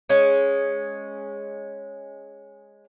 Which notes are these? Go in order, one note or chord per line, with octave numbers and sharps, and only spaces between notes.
G#3 C#4